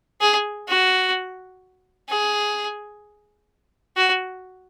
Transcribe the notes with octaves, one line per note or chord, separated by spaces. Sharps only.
G#4
F#4
G#4
F#4